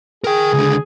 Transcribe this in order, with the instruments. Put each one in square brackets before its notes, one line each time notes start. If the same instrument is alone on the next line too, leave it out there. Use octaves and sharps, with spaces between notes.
[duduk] G#4 [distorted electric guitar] A#4 G5
[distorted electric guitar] C#2 D3